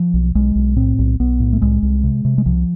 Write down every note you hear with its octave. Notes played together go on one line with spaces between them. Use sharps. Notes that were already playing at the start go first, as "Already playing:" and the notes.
Already playing: F3
B1
B1 G#3
B1
A2 C4
B1
B1 B3
A2
A3
C2 G#3
C2
C3
C3
G#3
C2 F3